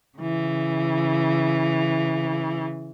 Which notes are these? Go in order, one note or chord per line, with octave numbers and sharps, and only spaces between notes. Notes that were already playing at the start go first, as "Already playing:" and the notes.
C#3 E3